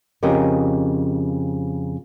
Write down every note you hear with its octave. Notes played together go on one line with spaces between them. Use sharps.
F2 C#3 G4 A#4 D#5